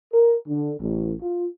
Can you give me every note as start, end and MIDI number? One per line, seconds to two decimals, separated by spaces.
0.13 0.36 70
0.48 0.75 50
0.80 1.14 33
1.22 1.46 65